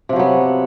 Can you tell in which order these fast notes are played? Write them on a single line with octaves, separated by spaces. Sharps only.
C3 F3 F#3 B3